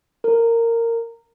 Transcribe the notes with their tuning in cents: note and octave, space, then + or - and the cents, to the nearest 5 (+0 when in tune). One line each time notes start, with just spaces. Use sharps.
A#4 -15